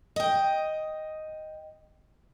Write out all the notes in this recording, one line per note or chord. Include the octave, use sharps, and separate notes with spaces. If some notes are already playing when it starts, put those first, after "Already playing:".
D#5 G5